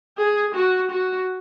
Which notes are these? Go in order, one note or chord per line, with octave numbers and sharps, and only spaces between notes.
G#4
F#4
F#4